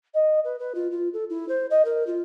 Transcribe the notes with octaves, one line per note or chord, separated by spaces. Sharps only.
D#5
B4
B4
F4
F4
A4
E4
C5
D#5
A#4
F4